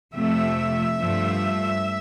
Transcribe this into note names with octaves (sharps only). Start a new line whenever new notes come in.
F2 C3 F3 A3 E5
G2 F3 A3